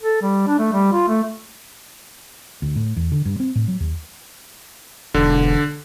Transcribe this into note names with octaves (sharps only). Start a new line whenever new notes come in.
A4
G3
D4
A3
G3
F4
A3
D2
A2
E2
D3
G2
C4
A2
F#3
D#2
E1 D3